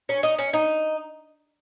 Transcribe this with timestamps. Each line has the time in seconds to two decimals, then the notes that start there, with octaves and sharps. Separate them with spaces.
0.09 C#4
0.23 D#4
0.39 C#4
0.53 D#4